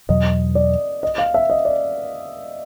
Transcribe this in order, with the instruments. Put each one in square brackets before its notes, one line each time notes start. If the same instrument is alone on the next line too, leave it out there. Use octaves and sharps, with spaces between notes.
[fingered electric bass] E2 B2 F#3 [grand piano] D#5
[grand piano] D5
D#5
F5
E5
D#5
D5